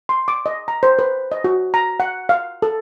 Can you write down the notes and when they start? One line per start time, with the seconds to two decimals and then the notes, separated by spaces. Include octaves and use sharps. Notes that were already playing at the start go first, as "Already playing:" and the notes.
0.09 C6
0.28 D6
0.46 D#5
0.68 A#5
0.83 C5
0.99 B4
1.32 D#5
1.44 F#4
1.74 A#5
2.00 F#5
2.29 F5
2.62 A4